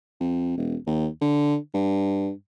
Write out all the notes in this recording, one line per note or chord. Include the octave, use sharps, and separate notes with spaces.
F2
E1
D#2
D3
G2